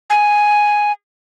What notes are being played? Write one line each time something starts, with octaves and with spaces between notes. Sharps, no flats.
G#5